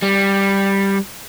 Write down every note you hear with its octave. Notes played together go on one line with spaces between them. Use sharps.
G3